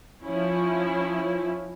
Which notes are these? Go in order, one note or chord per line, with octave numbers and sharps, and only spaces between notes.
F3 C#4 E4